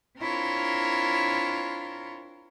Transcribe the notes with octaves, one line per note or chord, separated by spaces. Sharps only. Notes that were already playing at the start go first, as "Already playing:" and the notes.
C4 D4 E4 F4 A#4 C#5